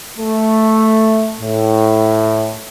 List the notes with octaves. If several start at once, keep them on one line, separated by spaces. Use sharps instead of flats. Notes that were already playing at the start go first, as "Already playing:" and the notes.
A3
A2